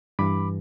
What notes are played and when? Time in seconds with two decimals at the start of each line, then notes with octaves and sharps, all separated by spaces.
0.19 G2 E3 B5 D6